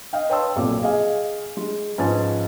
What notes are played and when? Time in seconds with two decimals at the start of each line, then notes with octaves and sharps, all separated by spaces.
0.13 D#5 F5 G5
0.29 B4 C#5 G5 A5 C6 E6
0.56 B1 F2 A#2 F#3 D6
0.82 G#4 D#5 F5 G#5
1.57 G#3
1.98 G#2 F3 C#4 B4 G#5 A6